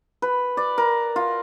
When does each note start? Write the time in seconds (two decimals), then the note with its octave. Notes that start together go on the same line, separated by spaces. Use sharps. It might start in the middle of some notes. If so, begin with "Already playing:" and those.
0.22 B4
0.57 D5
0.78 A#4
1.16 F4